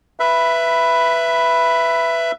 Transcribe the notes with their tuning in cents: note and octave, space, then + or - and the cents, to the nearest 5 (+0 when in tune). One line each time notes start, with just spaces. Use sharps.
B4 +0 E5 +15 B5 +0